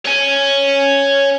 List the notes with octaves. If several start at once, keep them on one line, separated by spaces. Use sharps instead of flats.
C#5 G#5